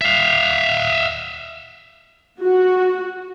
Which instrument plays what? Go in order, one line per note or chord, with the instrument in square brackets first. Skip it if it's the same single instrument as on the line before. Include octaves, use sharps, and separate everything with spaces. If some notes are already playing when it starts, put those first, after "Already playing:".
[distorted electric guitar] E5 F5
[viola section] F#4